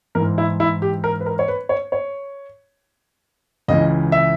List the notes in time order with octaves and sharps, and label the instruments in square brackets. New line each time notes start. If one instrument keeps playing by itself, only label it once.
[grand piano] G#2 E3 A#4
E4
E4
G4
A#4
B4
A#4
C#5
B4
C#5
C#5
C#2 C#3 E3 D#5
E5